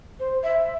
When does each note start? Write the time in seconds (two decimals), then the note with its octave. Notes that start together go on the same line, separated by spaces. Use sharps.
0.20 C5
0.43 E5